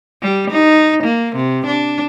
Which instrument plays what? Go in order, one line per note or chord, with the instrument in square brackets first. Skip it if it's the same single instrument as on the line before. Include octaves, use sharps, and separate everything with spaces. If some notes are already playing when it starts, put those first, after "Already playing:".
[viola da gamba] G3
D#4
A#3
C3
D4